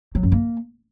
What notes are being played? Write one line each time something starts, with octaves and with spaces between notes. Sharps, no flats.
F#3
F#2
A#3